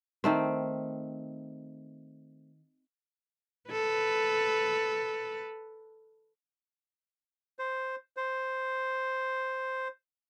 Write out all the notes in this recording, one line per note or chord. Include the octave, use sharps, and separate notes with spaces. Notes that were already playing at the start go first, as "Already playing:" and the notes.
D#3 A3 C4
A4 B4
C5
C5